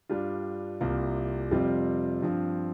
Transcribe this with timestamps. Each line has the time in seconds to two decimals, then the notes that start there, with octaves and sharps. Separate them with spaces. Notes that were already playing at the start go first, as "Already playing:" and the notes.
0.09 G2 G3 D4 F4
0.80 C2 C3 A#3 F4
1.51 F2 C3 G3 C4 F4
2.22 G2 F3 C4 F4